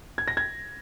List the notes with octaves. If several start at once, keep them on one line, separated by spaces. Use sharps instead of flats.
G#6
A#6
G#6